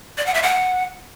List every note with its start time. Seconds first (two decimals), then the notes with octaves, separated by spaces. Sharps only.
0.18 D5
0.26 F#5
0.34 E5
0.43 F#5